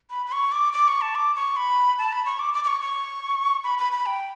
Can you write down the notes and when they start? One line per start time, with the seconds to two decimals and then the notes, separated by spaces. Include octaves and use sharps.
0.10 B5
0.26 B5
0.32 C#6
0.52 D6
0.73 D6
0.88 C#6
1.01 A5
1.15 D6
1.36 C#6
1.56 B5
1.98 A5
2.12 B5
2.26 C#6
2.39 D6
2.54 D6
2.64 D6
2.67 C#6
2.81 C#6
3.64 B5
3.78 B5
3.92 B5
4.06 G5